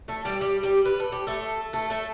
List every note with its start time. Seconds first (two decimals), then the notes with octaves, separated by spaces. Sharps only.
0.08 A3 A4
0.25 G3 G4
0.41 G3 G4
0.63 G3 G4
0.85 B4
1.00 A4
1.12 G4
1.27 A3 A4
1.73 A3 A4
1.90 A3 A4